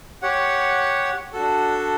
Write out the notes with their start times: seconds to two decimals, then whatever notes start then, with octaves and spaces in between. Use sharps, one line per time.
0.22 G4 C#5 F#5
1.33 D4 F#4 A4